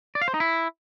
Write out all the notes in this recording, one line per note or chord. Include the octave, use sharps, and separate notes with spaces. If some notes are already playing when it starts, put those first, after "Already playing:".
D5
F5
C5
D#4
E4